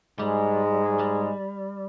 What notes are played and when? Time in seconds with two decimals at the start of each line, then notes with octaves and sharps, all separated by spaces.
0.19 G#2 G3 G#3
0.99 G3